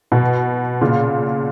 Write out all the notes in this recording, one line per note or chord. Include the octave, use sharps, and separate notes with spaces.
B2
A#2 C#3